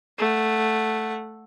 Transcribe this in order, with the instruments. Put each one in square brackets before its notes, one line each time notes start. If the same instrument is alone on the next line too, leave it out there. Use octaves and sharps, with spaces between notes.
[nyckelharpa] A3 F#5